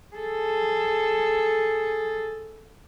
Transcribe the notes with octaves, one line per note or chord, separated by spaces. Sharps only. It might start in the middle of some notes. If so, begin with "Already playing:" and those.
G#4 A4